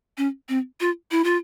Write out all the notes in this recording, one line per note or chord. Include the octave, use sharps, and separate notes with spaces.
C#4
C4
F4
E4
F4